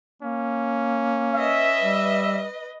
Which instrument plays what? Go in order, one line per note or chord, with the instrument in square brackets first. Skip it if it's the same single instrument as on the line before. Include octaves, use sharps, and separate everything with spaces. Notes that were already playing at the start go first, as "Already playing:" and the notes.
[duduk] A#3 [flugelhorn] C#4
[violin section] B4 D#5 [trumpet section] E5
[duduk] G3